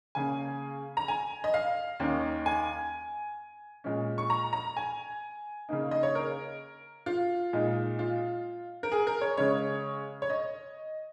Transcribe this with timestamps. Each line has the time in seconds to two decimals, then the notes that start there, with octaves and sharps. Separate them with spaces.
0.15 C#3 A#3 C#4 G#5
0.97 A#5
1.08 G#5
1.44 D#5
1.54 F5
2.00 D#2 D#3 A#3 C#4
2.46 G#5
3.84 A#2 G#3 C#4
4.18 C#6
4.30 A#5
4.53 A#5
4.77 G#5
5.69 C#3 A#3 D#4
5.91 D#5
6.03 C#5
6.15 A#4
7.06 F4
7.53 A#2 G#3 D#4
7.99 F4
8.83 A#4
8.92 G#4
9.07 A#4
9.21 C#5
9.37 C#3 G#3 C#4 C#5
10.22 C#5
10.30 D#5